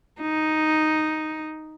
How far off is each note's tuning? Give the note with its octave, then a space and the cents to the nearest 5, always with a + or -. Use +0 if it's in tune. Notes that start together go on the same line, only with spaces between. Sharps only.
D#4 +0